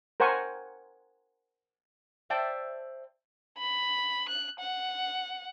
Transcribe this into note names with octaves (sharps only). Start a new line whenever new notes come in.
A#4 C5 F#5 G#5 C#6
C5 D5 E5 G5 A5
B5
F#6
F#5